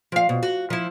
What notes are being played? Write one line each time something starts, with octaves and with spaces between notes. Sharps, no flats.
F3 F5
B2
F#4
F3 E4